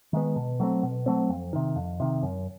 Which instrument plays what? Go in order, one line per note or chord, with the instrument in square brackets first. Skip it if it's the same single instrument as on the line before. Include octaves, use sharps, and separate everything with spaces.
[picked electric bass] D#3 G#3 B3
B2
F#3 A3 C4
B2
F#3 A3 C4
F2
C3 D#3
F2
C3 D#3
F#2